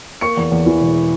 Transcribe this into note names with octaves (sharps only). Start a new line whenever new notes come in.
A#3 C#6 C#7
E2
E2
E3
E1